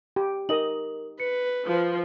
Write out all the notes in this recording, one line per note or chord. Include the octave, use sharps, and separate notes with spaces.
G4
D#4 A#4 D#5 F#7
B4 C#7
F3